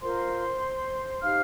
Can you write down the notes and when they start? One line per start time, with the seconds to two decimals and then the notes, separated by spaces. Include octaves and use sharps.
0.01 F4 A#4 C5 C6
1.21 D#4 G4 C5 F5 F6